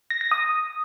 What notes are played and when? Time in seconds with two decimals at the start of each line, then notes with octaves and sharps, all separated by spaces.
0.10 A#6
0.21 A#6
0.32 D#6